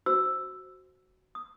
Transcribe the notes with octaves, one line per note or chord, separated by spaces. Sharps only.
F#4 C5 E6
D#6